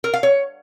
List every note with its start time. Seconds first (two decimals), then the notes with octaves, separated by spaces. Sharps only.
0.04 A#4
0.13 F5
0.23 C#5